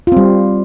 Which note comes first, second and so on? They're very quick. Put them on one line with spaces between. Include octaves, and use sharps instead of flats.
F4 C4 G3